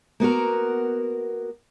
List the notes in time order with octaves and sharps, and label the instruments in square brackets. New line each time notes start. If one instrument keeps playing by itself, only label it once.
[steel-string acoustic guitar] A#3 B3 F#4 A#4